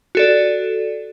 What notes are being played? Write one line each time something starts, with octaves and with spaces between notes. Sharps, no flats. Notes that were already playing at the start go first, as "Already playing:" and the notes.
F#4 A4 D5